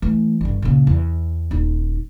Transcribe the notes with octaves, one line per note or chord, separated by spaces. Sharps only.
E3 A3
G1 G3
A#2 C#3
E2
D#1 D#4